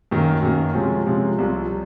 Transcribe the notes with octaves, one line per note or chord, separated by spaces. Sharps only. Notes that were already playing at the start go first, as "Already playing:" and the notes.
F#2 D#3 A#3
F#2 D#3 A#3
C3 F3 G#3 C#4
C3 F3 G#3 C#4
C2 C3 F3